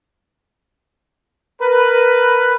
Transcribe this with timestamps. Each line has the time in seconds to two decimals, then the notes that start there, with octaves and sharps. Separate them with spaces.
1.62 A#4 B4